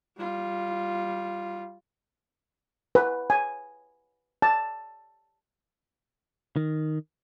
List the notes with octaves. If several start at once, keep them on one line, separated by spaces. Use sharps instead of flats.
G3 F4
B4
G#5
A5
D#3